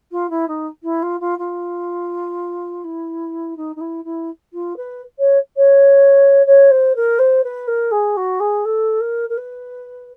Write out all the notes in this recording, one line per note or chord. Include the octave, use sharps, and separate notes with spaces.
F4
E4
D#4
E4
F4
F4
F4
E4
D#4
D#4
E4
E4
F4
B4
C#5
C#5
C#5
C5
A#4
C5
B4
A#4
G#4
F#4
G#4
A4
A#4
A#4
B4